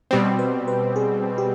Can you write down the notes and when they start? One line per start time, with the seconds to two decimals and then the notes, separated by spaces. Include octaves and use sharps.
0.11 B2 G3 C4
0.39 B4
0.68 B4
0.96 G#4
1.38 G4